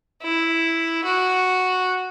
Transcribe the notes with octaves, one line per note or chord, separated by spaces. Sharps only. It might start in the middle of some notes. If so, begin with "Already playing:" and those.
E4
F#4